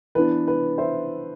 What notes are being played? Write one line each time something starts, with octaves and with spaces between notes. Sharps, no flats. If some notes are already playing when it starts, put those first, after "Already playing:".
E3 B3 D4 B4
B4
C5 E5